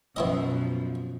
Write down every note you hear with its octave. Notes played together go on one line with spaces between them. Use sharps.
F#2 B2 F3 B3 E4 D#5